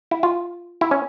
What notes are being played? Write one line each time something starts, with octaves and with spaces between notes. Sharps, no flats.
E4
F4
E4
C#4